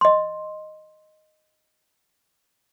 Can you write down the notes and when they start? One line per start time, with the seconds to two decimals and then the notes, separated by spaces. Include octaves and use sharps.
0.01 D#5 C6